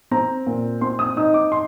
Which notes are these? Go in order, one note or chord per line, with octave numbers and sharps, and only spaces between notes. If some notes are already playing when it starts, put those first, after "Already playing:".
C4 A#5
A#2
C4 C6
D#6
D#4 D#6
D6
C6